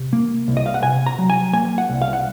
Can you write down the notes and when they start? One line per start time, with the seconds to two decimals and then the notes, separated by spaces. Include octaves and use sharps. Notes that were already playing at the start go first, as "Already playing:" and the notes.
Already playing: C3
0.13 A#3
0.48 C2
0.57 D#5
0.66 F5
0.74 F#5
0.83 C3 G#5
1.06 A#5
1.19 F#3
1.30 G#5
1.53 A#3 G#5
1.78 F#5
1.90 C2
2.02 F5
2.13 F#5